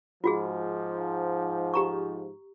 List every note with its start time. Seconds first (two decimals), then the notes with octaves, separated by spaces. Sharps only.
0.24 G#2 F3 F4 F#4 G#4
1.74 G4 A#5 C#6